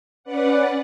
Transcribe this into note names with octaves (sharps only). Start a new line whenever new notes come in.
C#4 B4 D5 F#5